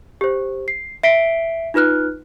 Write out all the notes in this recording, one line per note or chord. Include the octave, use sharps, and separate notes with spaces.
G4 C5
C7
E5 B6 C7 D7 G7
D#4 F4 B4 F6 F#6